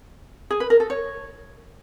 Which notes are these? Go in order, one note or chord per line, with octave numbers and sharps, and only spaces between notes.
G#4
B4
A#4
A4
C#5